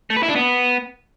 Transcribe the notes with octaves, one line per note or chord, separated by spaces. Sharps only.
A3
B4
E4
D4
B3